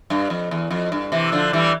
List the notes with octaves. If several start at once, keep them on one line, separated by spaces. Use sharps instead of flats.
G2
F2
E2
F2
G2
C3 E3
D3 F3
E3 G3